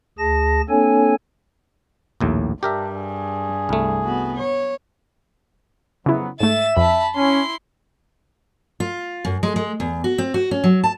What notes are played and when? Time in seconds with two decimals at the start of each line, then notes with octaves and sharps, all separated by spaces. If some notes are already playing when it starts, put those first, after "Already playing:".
0.18 D2 G#4 A5 A#6
0.69 A#3 C4 D4 A4 C#5 G#5
2.21 A#1 D#2 A2
2.63 G2 D4 G4 A#4 E5
2.96 G#4
3.69 C2 A3
4.03 B3 F#4
4.36 C#5
6.06 F2 C#3 F#3 B3 E4
6.40 G#2 A3 E5 A6 E7
6.77 F2 A5 B5
7.16 C#4 E4 C6
8.80 F4
9.25 F#2
9.43 G#3
9.56 G#3
9.80 E2
10.04 F#4
10.18 C4
10.34 F#4
10.51 C#4
10.64 F#3
10.84 A5